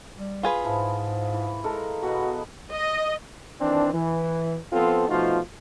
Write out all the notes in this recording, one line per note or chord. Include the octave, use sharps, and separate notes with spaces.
G3
F4 G#4 B4
G#2 F3 E4
E3
G#3 A4 A#4
B2 B3 F#4
D#5
D#3 E3 C4 D4
E3
F3 B3 C4 F4 A4
B2 F3 A3 D#4 F4 F#4